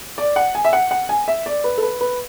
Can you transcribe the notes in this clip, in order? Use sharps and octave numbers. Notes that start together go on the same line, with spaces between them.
D5
F#5
G#5
E5
F#5
F#5
G#5
E5
D5
B4
A4
B4
B4